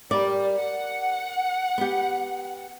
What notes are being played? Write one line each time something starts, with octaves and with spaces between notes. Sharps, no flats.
G3 A#4 D5
F#5
B3 G4